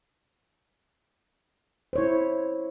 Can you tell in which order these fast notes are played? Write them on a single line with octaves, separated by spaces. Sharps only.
C5 C#5 E4